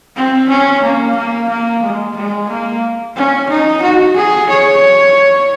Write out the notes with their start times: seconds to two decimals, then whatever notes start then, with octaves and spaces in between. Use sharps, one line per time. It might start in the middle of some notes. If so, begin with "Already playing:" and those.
0.16 C4
0.49 C#4
0.82 A#3
1.16 A#3
1.49 A#3
1.83 G#3
2.16 G#3
2.49 A#3
3.16 C#4
3.49 D#4
3.82 F#4
4.16 G#4
4.50 C#5